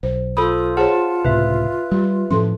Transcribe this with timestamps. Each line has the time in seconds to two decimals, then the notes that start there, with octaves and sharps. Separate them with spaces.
0.03 B1 C5
0.37 F4 A4 C5 B5 D#6
0.77 G#4 C5 C#5 F#5 A5
1.25 C#2 A2 C3 B4 E5
1.91 G3 G4
2.31 A2 F3 C#4 A4 C6